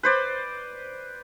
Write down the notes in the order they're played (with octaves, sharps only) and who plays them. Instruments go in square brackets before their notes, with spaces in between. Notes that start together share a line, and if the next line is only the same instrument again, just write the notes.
[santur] B4 C5 D5